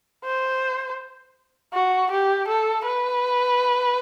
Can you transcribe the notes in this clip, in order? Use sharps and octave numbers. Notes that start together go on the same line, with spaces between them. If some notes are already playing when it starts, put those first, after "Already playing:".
C5
F#4
G4
A4
B4